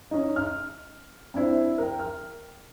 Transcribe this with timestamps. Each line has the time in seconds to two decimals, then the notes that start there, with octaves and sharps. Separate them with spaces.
0.11 C#4 D#4
0.36 F6
1.34 C4 D4 E4 C5
1.78 A#4 G5
1.99 F6